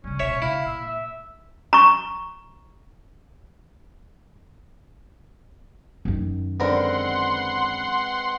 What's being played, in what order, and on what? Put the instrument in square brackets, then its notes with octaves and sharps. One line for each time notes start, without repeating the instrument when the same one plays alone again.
[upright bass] C#3 G3 [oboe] C#4
[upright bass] D1 B2 [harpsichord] C#5 E5
[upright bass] C#3 [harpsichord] E4 [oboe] F5
[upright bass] A#2 [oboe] E5
[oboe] E5
[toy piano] A#5 C#6
[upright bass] F#2 D#3
[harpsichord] D3 A#4 [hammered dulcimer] G#3 C4 B4 [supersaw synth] F#5 C6